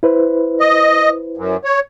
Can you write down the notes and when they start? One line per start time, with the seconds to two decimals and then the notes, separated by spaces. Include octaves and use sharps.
0.03 E4 B4 C5
0.60 D#5
1.37 F#2
1.64 C#5